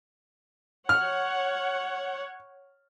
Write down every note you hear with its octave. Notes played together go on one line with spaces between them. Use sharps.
C#5 F#5 F6